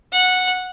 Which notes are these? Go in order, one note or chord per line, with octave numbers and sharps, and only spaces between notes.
F#5